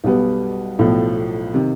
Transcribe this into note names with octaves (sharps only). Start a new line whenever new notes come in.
B1 B2 G3 B3
B1 A2 F3
C3 D#3